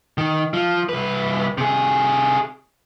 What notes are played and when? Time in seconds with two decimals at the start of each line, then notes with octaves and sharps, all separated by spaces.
0.18 D#3
0.54 F3
0.89 C2 B4
1.58 C3 G#4